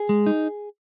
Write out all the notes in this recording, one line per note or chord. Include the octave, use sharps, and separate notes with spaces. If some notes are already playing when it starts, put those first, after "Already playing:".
Already playing: G#4
G#3
D#4